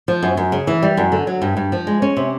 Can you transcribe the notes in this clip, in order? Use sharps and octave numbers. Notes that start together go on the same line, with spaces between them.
F3
F#2
F#2
C#3
E3
G3
F#2
D3
F#3
G2
G2
F3
G#3
C#4
C3